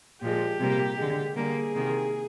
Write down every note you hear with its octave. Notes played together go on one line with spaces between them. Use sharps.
A#2 F3 G#3 G4
C3 G3 A#3
D3 G#3
D3 G3 A#3 G#4
C3 D#3 A#3